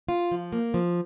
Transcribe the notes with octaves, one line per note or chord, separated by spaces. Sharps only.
F4
F3
A#3
F3